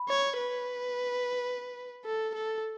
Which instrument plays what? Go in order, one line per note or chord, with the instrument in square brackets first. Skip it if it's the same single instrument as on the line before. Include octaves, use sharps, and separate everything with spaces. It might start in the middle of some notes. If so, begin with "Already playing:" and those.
Already playing: [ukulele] B5
[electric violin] C#5
B4
A4
A4